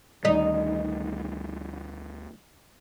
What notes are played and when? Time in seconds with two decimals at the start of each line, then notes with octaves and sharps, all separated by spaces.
0.25 D2 D#3 G3 D#4